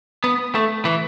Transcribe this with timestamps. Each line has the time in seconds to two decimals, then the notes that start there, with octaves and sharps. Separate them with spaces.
0.24 B3
0.55 A3
0.85 E3